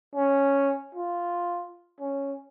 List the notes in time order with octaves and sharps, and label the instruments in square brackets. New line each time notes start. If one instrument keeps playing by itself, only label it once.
[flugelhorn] C#4
F4
C#4